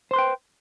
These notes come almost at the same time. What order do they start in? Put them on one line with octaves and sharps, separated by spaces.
C5 C6 B4 G5